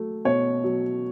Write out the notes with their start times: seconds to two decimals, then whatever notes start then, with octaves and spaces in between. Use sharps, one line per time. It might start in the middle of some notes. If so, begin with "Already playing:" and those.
Already playing: F#3 A3
0.25 B2 C#5
0.64 F#3